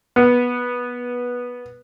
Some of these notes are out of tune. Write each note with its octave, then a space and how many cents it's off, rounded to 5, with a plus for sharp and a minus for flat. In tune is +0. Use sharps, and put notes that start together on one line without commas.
B3 -15